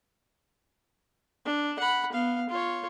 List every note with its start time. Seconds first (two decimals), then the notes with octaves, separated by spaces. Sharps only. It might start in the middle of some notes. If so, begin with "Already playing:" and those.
1.45 D4
1.79 F#5 B5
2.13 B3 F5
2.49 F4 C#5